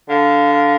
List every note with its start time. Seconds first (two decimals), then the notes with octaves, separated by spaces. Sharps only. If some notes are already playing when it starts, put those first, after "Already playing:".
0.09 D3 F5
0.53 F5